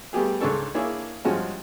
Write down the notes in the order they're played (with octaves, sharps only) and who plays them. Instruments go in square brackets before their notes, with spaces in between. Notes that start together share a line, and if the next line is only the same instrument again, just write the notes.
[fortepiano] G3 A3 B3 G4 G#4
C#2 G#2 C#4 D4 A4 C#6
A#3 D4 E4 G#4 C#5
G2 F3 G#3 C#4 F#4